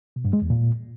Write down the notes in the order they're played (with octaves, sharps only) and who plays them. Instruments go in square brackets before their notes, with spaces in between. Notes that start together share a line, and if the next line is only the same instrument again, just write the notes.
[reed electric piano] B2
G2
G#3
E2
A#2